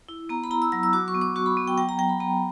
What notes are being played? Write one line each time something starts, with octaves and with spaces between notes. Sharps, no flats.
E4
B3 A#5
B5
E4 A#5
E6
F#3 E6
E6
F#4 D6
C#6
B3
D6
F#4 C#6
B5
B3
G5
F#3 G5
A#5
F#3 G5
B5
B3 A#5